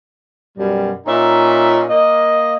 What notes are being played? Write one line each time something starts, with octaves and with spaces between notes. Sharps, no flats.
F#2 B2 G3
A#2 C#4 D#4 E5
A#3 D#5